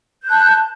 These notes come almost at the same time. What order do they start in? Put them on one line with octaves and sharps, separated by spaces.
G6 F#6 A5